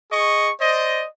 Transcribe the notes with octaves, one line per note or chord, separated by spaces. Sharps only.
G#4 D#5 C#6
C5 D5 D#5